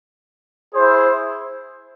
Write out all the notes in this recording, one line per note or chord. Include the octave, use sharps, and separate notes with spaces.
E4 G#4 C5